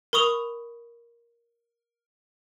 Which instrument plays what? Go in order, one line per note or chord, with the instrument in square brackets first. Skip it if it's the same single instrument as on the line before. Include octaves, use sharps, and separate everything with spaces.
[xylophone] A#4 B5 C#6 D#6 F7